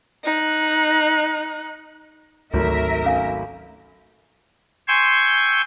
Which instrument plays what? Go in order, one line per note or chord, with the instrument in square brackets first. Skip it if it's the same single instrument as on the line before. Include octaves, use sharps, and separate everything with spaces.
[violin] D#4 F#6
[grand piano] G#1 F#3 A3 [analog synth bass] D2 [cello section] A#4 E5
[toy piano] C#4 F5 G#5
[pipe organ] G5 G#5 C6 C#6 E6